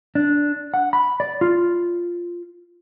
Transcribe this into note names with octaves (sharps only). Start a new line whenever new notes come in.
D4
F#5
B5
D5
F4